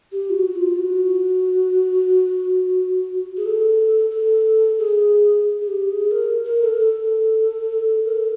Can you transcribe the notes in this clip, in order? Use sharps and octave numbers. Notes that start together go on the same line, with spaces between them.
G4
F4
F#4
F4
F#4
G#4
A4
A4
G#4
G#4
G4
G#4
A#4
A#4
A4
A4
A#4
A4